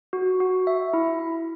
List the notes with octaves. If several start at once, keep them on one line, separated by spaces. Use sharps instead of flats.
F#4
F#4
E5
E4
E4